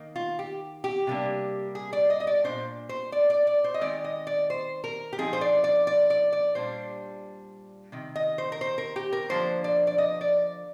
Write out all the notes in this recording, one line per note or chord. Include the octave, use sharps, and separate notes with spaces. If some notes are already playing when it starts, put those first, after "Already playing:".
Already playing: D#3 A#3 D#4
F4
G4
G4
C3 G3 A#3 D4
G#4
D5
D#5
D#5
D5
A#2 G#3 D4 C5
C5
D5
D5
D5
C5
D#5
D#3 G#3 C4 D5
D#5
D5
C5
A#4
G4
D3 F3 C4 D#4 G#4
C5
D5
D5
D5
D5
D5
A#2 G3 D4 C5
C3 D#3
D#5
C5
A#4
C5
A#4
G4
A#4
D3 F3 A#3 D4 C5
D5
D5
D#5
D5